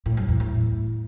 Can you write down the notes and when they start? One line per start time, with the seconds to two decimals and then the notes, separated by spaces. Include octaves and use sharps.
0.06 A2
0.17 F#2
0.29 E2
0.40 A2